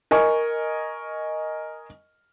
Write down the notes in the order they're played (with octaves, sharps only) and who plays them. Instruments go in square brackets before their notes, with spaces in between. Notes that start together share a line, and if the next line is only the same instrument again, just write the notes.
[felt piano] A#4 D#5 G#5 C#6